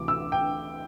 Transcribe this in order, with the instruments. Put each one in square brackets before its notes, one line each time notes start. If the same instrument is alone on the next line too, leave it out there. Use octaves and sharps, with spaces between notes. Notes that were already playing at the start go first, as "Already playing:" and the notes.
Already playing: [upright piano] D2 C3 E3 A3 D6
E6
G5